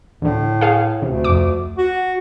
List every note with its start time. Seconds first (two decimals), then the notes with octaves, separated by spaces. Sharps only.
0.22 D2 A2 D3
0.61 G#4 F5
1.02 D2 C3
1.24 F2 D6
1.78 F#4